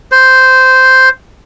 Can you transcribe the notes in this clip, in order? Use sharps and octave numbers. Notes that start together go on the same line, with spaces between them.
C5